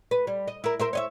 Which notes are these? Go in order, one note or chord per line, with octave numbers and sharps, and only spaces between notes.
B4
G3
D#5
E4 A#4
A#4 C5 E5
C#5 D#5 E5